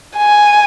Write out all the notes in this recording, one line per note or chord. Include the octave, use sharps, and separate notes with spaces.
G#5